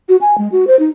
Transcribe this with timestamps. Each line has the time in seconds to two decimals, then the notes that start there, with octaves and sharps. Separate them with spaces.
0.09 F#4
0.21 G#5
0.38 G#3
0.52 F#4
0.67 C5
0.79 D#4